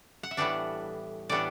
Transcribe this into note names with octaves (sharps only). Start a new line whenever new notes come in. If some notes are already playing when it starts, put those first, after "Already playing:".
F#5
E5
A2 E3 G3 B3 D4 D5
A2 E3 G3 B3 D4 D5